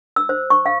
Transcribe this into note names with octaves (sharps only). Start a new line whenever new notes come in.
E6
C5
C#6
F5